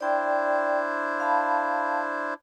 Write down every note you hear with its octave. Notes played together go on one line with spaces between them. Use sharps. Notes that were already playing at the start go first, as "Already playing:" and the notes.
D4 E4 C5 D5 G5
F5 A5 B5